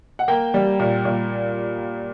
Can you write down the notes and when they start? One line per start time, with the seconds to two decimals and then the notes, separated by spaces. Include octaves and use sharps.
0.19 F#5
0.28 A#3 G5
0.54 G3
0.80 A#2
1.05 A#2